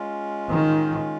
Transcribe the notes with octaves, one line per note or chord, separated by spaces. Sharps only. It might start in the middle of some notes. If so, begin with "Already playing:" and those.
Already playing: G#3 C#4 F4
D#3